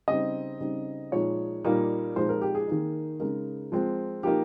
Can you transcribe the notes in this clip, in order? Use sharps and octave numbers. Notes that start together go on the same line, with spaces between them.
C#3 G3 C4 D#4 D#5
C#3 G3 C4 D#4
A#2 F3 G#3 D#4 C#5
A#2 G3 A#3 D#4
A#2 F3 G#3 D#4 C5
A#4
G4
G#4
D#3 A#3 D#4
C#3 G#3 D#4 A#4
F3 G#3 C4
F3 A#3 D#4 G4